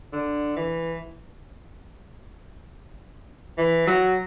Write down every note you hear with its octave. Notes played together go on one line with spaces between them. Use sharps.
D3
E3
E3
F#3